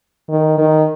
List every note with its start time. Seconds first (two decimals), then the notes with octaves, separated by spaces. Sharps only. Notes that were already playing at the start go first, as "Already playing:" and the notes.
0.29 D#3
0.58 D#3